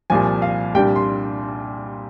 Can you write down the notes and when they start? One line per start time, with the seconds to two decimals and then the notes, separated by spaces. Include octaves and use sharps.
0.10 C2 A#2 F3 G#5
0.42 F5
0.74 C2 A#2 G3 D4 G5
0.96 C6